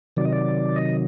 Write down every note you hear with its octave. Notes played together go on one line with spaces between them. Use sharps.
C3 D#3 F#3 D5
D#5
D5
D#5